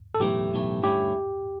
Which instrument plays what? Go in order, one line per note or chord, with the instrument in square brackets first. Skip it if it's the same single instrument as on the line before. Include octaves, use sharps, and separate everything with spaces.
[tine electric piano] A4
[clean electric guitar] B1 A2 E3 A3 [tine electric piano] G4
[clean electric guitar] B1 A2 E3 A3
[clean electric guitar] G2 D3 A3 C#4 E4 [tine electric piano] G4